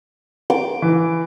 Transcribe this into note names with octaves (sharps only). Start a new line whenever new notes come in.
D6
E3